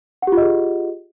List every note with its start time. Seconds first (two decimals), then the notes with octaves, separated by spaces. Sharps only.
0.22 F#5
0.27 G4
0.32 F4
0.37 D#5
0.42 G#4